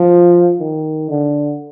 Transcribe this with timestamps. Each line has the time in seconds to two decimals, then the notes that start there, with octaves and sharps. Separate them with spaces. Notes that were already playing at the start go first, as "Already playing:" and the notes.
Already playing: F3
0.59 D#3
1.10 D3